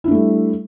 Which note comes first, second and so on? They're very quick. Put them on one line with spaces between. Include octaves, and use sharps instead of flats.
E4 D4 A3 G3